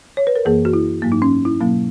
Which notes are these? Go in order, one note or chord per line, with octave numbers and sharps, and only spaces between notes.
C#5
B4
A#4
F#2 E3 A#3 G#4
F#4
E4
G#2 F#3 A#3
D#4
C#4
E4
B2 F#3 A#3